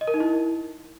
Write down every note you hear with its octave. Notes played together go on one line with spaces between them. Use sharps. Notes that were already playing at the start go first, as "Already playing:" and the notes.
D#5
A#4
D#4
E4